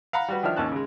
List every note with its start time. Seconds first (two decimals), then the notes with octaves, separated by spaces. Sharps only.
0.13 F5 F#5 A#5 B5
0.28 G3 F#4 B4
0.43 D#3 F3 D4 E5 F6
0.56 G#1 D#2 C#4 A5 F#6
0.72 C#3 G#3